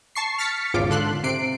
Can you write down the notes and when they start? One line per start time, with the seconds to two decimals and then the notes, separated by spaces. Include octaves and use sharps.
0.15 A5 C#6 C7
0.39 F6 A6 B6 C#7
0.74 G#1 E2 C#3 F4 D6
0.89 G#1 D3 A4 C6 F#6
1.23 C3 C7 D7